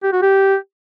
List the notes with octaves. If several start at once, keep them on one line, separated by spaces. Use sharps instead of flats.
G4
F#4
G4